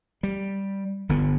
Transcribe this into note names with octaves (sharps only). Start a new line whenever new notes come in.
G3
G1 D3 B3